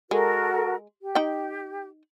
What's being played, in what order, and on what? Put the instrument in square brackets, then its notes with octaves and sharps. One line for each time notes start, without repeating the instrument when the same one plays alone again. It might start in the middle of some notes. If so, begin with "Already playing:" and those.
[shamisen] G#3 [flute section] F#4 A4 A#4
[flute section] G4
[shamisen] D#4 G5